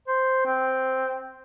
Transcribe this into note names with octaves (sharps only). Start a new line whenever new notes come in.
C5
C4